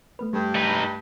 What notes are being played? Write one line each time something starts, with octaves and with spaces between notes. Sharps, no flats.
A3 B3 B4
G2 G3 A3
D#4 B4